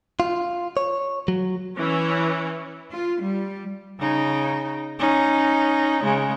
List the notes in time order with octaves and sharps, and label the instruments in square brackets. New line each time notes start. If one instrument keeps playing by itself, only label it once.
[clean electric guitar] F4
C#5
F#3
[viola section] E3 C#4
[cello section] F4
G3
[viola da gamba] C#3 D#4
C#4 D#4
C#3 G#3